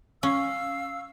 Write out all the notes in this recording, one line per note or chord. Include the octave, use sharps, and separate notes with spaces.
C#4 F5 E6